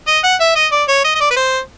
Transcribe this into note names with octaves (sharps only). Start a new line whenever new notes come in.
D#5
F#5
E5
D#5
D5
C#5
D#5
D#5
D5
B4
C5